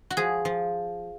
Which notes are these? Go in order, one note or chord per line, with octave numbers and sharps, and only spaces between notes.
F#4
F3 G#4
F3